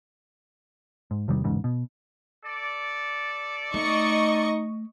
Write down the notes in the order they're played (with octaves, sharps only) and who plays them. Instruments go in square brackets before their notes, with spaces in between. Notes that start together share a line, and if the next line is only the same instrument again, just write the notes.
[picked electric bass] G#2
E2 C3 D#3 G3
D1 E2 G#2 C#3
B2
[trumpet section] A4 D5
[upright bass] A3 [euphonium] D#4 [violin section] D#5 C#6